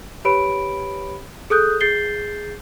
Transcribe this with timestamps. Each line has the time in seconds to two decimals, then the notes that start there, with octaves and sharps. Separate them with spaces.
0.25 G4 B4 C#5 B5 D7
1.50 G#4 A4 D#6 F#6 G6
1.80 G#4 G6 A6 C7 G7